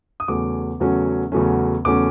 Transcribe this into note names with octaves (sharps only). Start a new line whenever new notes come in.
D#6
E2 C#3 F#3 A3 C#4 D6
E2 C#3 F#3 A3 C#4
E2 C#3 F#3 A3 C#4
E2 C#3 F#3 A3 C#4 D6